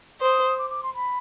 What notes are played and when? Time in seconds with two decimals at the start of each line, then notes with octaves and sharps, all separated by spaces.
0.21 C5 D#6
0.59 D6
0.70 D6
0.83 C6
0.94 B5